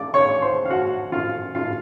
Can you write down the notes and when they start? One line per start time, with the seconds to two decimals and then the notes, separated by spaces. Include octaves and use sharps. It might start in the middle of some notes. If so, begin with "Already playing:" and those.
Already playing: D5 D6
0.14 C#5 C#6
0.42 C5 C6
0.65 F5
0.70 F#4 F#5
1.12 F4 F5
1.55 F4 F5